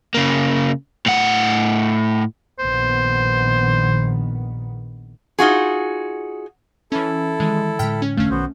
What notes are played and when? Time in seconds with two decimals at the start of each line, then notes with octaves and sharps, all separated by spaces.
0.14 C#3 A#3
1.06 A2 F#5
2.59 A#1 D#3 B3 C5
5.39 D#4 F4 F#4 G#4
6.92 E3 C#4 E4 A4
7.40 D#3 E3 G#3
7.79 A2 D3 G#3 G5 F6 B6
8.02 C#4
8.17 F1 D3 A3 C#4 F5
8.30 B1 D#3 B3 F#4 C5